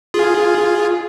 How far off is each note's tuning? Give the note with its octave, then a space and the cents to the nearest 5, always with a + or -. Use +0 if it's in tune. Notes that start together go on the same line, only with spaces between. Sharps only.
F4 +0 G#4 +0